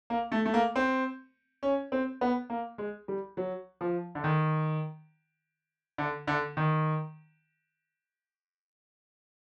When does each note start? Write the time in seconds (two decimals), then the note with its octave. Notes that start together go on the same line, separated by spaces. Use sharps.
0.10 A#3
0.32 A3
0.45 A3
0.54 A#3
0.76 C4
1.63 C#4
1.92 C4
2.21 B3
2.50 A#3
2.78 G#3
3.08 G3
3.37 F#3
3.81 F3
4.15 D3
4.24 D#3
5.98 D3
6.27 D3
6.57 D#3